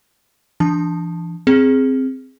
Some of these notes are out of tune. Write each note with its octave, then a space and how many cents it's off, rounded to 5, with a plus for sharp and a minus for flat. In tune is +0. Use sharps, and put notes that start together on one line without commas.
E3 +35 D4 +0 A5 +0
C4 +0 G#4 +0